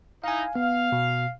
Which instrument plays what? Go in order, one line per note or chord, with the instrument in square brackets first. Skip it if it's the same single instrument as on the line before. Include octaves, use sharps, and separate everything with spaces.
[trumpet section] D#4 E4 [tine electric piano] F5 G#5
[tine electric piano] B3 [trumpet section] F5
[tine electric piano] B2